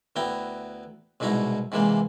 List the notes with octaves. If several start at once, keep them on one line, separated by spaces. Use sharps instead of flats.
D2 B3 E4 G5 A#5
C2 G#2 B2 D#4 E4 A#5
G#2 C3 E3 G#3 A#3